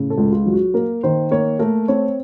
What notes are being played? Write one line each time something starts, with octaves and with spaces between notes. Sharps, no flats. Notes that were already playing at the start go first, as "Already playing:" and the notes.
Already playing: A2 C#3
A4
C#2
F4
F#3
F#4
A#3 A#4
D#3 C5
A#3 C#5
A3 A#4
C4 C#5